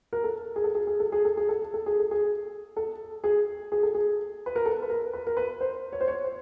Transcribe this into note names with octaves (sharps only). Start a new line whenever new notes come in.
A#4
A4
G#4
A4
G#4
G#4
A4
G#4
A4
G#4
A4
G#4
A4
G#4
A4
G#4
A4
G#4
G#4
A4
G#4
B4
A#4
A4
B4
A#4
B4
A#4
B4
C5
C#5
C5
C#5
C5